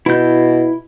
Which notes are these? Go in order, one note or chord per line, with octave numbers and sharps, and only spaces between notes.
B2 E4 G6